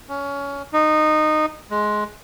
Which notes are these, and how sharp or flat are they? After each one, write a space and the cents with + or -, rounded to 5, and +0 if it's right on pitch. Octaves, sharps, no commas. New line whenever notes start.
C#4 +20
D#4 -15
G#3 +15